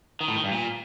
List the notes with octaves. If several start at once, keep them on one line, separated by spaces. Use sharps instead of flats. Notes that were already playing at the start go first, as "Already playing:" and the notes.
D#3
A2
D#3
G2
A#2